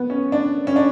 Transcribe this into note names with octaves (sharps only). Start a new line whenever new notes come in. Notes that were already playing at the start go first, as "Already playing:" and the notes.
Already playing: B3
C#4
D4
C#4
D4